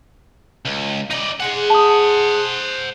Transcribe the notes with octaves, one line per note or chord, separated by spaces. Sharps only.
C#2
E3 D#4 D5 D#5 A#5
G#3 G#4 C5 F#5
A5 D#6